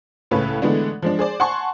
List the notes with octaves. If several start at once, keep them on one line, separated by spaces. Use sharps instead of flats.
C#2 A2 C#4 A4 B4
D3 E3 G#3 A3 B3 D4
F3 G#3 D4
G#4 C5 D5
F#5 G#5 A5 C6 C#6